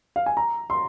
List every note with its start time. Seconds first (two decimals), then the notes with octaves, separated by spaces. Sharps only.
0.16 F5
0.26 G#5
0.37 A#5
0.70 C6